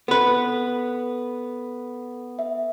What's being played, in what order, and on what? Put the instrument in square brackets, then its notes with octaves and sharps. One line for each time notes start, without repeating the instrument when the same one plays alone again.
[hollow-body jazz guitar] B3 B4 [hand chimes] A4
[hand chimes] E5